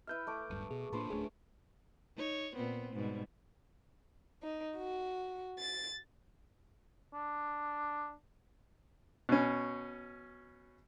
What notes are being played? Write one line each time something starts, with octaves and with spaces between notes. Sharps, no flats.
E4 B4 E5 F6 G6
A3 D6 D#6
D1 G2
B2 G#4
A2 A#3 D4 F4 B4 C5
D1 A3 C#4 D4 G#4
D#4 C#5
A#2 B3 C4
G#2 B2 G3
D#4
F#4
A6
D4
B2 C#4